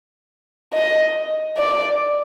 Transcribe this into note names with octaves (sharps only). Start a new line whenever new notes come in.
D#5
D5